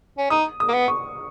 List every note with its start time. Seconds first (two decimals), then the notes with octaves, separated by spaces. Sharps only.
0.18 C#4
0.30 D#4 D#6
0.60 D#6
0.68 A#3
0.73 B3
0.88 C#6